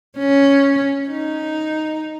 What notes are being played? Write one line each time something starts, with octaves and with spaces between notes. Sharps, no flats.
C#4
D#4